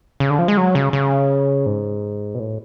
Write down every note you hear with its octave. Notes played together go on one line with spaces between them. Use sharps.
C#3
D3
F3
G#3
F#3
C#3
C#3
G#2
B2
A2